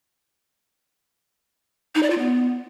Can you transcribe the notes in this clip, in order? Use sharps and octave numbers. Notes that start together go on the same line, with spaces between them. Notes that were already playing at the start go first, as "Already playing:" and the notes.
D#4
D5
F4
B3